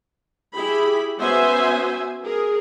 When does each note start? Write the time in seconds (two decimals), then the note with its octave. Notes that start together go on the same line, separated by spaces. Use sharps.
0.55 E4 G4 G#4 B5
1.19 B3 C#4 F#4 C5 E5 G#5
2.23 G#4 A#4